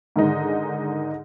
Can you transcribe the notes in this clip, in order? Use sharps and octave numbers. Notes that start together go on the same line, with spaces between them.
G#2 D3 D#3 G#3 D#4